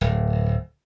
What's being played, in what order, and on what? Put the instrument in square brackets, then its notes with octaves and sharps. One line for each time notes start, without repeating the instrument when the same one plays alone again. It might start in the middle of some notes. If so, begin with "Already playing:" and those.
[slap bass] D1